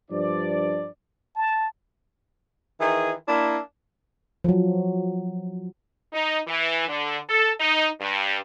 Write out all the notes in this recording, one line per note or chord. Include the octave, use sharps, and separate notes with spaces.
G2 F3 D4 C5 D5
A5
D#3 E3 G#4
A#3 D4 E4
F3 F#3
D#4
E3
D3
A4
D#4
G2